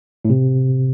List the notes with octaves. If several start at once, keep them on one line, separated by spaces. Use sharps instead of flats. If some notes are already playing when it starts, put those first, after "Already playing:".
A2
C3